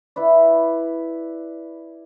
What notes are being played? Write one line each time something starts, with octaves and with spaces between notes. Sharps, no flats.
E4 B4 D5